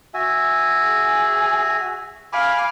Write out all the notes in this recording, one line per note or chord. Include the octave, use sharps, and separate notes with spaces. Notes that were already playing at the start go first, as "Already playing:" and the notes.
F#4 E5 G#5
G#4
F5 G#5 B5 D6